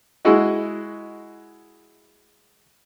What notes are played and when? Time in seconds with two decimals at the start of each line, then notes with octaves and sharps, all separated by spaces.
0.25 G#3 E4 F#4 D#5